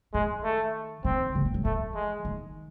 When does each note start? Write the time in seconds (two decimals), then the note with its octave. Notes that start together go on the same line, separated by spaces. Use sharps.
0.14 D#3 G#3
0.44 A3
1.05 D#3 C4
1.35 C#3
1.45 E3
1.54 F#3
1.65 E3 A3
1.95 G#3
2.25 D#3